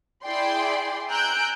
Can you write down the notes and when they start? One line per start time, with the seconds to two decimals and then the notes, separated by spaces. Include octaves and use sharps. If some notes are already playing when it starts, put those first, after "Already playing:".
0.23 E4 G#4 D5 G5 C6
1.08 G#5 A#5 E6 F#6 G6 D7